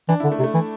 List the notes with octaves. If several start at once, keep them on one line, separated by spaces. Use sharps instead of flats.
E3 D4
D3 E4
A3
C3
A3
E3